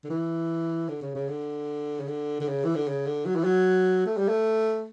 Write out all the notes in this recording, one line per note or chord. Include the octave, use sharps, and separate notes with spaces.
D3
E3
D3
C#3
C#3
D3
C#3
D3
D3
C#3
E3
D3
C#3
D3
F#3
E3
F#3
A3
G3
A3